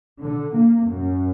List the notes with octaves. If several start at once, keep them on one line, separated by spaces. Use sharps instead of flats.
D3
A#3
F#2